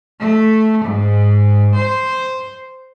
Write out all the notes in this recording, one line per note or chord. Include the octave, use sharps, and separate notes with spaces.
A3
G#2
C5